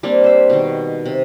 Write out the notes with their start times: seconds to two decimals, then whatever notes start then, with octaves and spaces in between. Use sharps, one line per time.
0.03 G3 A#3 C4 D4
0.24 C5 E5
0.50 B2 D#3
1.06 C3